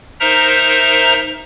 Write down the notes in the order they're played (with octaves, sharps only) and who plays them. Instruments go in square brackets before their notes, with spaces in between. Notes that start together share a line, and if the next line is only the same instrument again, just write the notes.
[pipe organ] D#4 A#4 C5 E5 A#5